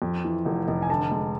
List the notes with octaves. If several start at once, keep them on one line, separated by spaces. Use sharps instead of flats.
F2
E3
F1
F1
G#5
D3 A5
G#3